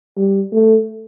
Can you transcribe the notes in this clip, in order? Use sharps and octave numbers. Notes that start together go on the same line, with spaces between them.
G3
A3